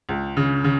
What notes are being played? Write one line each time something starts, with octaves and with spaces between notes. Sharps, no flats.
C#2
C#3
C#3